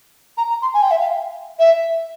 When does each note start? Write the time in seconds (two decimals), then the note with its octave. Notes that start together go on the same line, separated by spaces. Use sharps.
0.37 A#5
0.49 A#5
0.62 C6
0.74 G#5
0.82 G5
0.91 E5
1.00 F5
1.59 E5